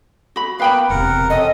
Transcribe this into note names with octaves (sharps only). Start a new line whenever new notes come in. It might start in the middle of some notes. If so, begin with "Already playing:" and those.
F#4 B5
A#3 B3 B4 F5 G5 B5
E1 C3 A#4 F#5
C4 C#4 A4 D#5